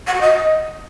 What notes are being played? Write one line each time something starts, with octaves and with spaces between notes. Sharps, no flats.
F#5
F#4
D#5